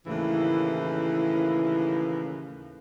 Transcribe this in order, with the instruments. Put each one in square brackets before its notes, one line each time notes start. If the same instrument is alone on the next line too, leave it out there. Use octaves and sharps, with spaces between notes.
[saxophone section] D#2 A2 C#3 E3